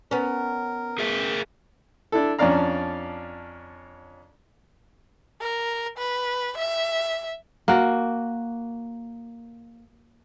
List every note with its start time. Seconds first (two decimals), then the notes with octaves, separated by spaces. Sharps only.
0.11 B3 C#4 A#4
0.99 G#4 A#4 E5
2.12 D4 E4 A4
2.39 F2 C#4 D4 D5 F5 A#5
5.41 A#4
5.98 B4
6.58 E5
7.68 A#3 F#4